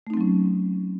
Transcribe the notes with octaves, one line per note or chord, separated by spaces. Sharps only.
F#3 A3 C4 C#4 D#4